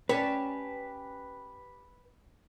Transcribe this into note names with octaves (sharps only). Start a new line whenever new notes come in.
C#4 G4 B4 G#5 A5